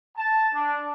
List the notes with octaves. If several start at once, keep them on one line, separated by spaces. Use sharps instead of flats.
A5
D4